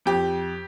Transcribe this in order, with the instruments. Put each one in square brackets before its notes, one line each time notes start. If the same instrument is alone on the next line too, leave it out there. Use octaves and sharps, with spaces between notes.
[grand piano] F2 G4